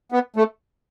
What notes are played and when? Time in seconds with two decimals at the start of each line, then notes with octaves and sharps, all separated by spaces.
0.12 B3
0.36 A3